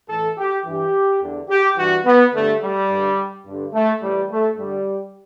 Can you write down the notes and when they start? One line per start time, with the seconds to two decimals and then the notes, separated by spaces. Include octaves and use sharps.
0.09 A2 E3 A4
0.38 G4
0.65 G2 E3 G4
1.22 E2 D3
1.49 G4
1.77 G2 E3 F#4
2.05 B3
2.33 G2 D3 A3
2.62 G3
2.89 G2 D3
3.46 G2 D3
3.73 A3
4.01 A2 E3 G3
4.30 A3
4.57 G2 D3 G3